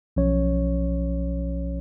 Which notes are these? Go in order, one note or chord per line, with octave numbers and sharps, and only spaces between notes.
B1 F3 C#4 C#5